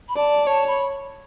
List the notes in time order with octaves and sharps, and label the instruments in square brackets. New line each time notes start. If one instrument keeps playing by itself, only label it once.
[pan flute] B5
[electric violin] D5 [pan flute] A5
[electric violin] C#5 [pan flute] A5
[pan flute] B5